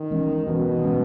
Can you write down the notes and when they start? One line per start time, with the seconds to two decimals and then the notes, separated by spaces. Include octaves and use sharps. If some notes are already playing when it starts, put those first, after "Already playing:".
Already playing: D#3
0.11 E3 G#3 C#4
0.47 B2 E3 G#3 C#4
0.82 E3 G#3 C#4